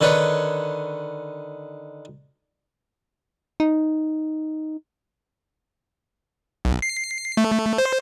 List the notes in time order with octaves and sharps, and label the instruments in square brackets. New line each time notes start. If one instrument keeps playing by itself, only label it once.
[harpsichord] D3 D#3 B4 C#5
[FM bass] D#4
[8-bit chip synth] B1
C7
A3
C5